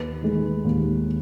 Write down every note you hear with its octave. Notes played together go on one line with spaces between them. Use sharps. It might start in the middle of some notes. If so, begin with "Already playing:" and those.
Already playing: D#2 B4
D#3 G#3
D#2